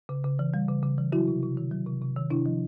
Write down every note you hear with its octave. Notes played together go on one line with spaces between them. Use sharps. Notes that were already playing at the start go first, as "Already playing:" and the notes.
C#3
C#3
E3
G3
C#3
C#3
E3
F#3 E4 F#4
C3
C3
D#3
F#3
C3
C3
D#3
C3 D4 E4
F3